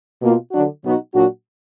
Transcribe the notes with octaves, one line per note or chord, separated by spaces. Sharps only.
B2 A#3 F4
D3 F#3 D4 F#4
B2 F#3 B3 D#4 F#4
A#2 F#3 D4 F#4